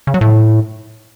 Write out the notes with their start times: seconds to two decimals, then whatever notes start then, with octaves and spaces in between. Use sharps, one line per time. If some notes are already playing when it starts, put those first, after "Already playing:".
0.07 C#3
0.14 F#3
0.21 A2